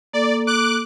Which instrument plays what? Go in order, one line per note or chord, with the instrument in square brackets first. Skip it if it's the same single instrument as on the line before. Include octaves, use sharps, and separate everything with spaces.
[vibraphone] A#3 A4 [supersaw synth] D5
[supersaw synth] D6 F#6